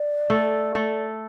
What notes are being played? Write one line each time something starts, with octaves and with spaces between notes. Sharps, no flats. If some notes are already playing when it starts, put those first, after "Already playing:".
Already playing: D5
A3 A4
A3 A4